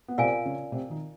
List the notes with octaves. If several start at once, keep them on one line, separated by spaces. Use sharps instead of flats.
B3
C3 C4 F4 A#4 D5 F5 G#5
C#3 C#4
C3 C4
D#3 D#4